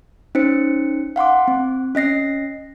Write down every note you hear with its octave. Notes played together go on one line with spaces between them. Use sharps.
C#4 D#4 C5 C#7
F5 F#5 C6 D6
C4
C#4 D#5 A#6 C7